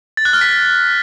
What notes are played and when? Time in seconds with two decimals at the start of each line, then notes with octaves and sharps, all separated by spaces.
0.17 A6
0.25 F#6
0.33 F6
0.41 B6